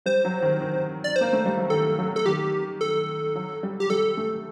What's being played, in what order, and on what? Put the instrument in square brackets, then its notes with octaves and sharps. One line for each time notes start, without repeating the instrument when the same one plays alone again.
[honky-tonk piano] G3 [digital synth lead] C5
[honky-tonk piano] F#3
D#3
D#3
[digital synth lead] D5
C5
[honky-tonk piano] A#3
A3
G3
F#3
[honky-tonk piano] D#3 [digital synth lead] A4
[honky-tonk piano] F#3
[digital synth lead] A4
[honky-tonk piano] D#3 [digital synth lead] G4
[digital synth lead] A4
[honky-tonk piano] F#3
G3
[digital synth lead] G4
[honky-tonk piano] G3 [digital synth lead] A4
[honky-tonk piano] A3